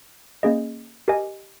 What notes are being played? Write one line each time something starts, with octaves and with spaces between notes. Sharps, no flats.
A#3 C#4 G#4 D#5
G4 A#4 D#5 G#5